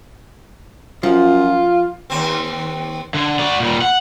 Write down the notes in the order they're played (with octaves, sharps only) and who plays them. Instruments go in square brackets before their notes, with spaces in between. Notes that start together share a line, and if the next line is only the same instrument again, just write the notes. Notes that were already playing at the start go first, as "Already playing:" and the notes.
[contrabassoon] F#2 [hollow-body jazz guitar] F3 [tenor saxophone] F4
[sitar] D#2 C4
[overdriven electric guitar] D3
F#4 D5
A#2 G3
F#5